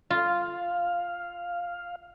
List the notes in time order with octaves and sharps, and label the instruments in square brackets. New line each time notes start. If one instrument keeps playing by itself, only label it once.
[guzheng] F4 [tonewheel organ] F5